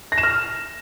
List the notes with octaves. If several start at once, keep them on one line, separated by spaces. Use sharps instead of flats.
A#6
E7
F6